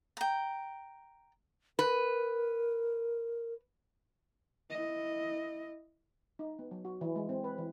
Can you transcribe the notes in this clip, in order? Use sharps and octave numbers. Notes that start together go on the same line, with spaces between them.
G5 A#5
A#4 B4
E4 D#5
D#4
B3
F#3
F#4
E3
G#3
C4
B4
E3